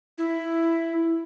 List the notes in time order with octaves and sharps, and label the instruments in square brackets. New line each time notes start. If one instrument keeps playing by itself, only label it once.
[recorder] E4